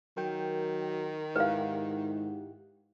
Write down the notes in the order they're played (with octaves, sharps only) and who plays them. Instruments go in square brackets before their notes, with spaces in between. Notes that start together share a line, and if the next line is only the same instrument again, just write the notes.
[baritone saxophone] D#3 [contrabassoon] F#3 [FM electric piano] A#4 G5
[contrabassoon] G#2 [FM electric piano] E4 G4 F#5 [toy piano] B4 F5